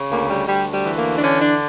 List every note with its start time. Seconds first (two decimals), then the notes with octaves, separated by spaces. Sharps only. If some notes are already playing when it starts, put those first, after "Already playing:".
Already playing: C#3
0.10 D2 A#3
0.28 G3
0.47 D2 G3
0.72 G3
0.85 E3
0.97 A#3
1.16 D4
1.21 D3 C#4
1.40 D4